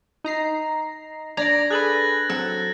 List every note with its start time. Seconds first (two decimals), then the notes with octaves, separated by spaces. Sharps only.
0.24 D#4 A#5 C7
1.37 D4 D5 A#5 G#6 A#6
1.70 G#4 A4 B4 F#6 A6 F#7
2.30 F#3 C4 A4 F#6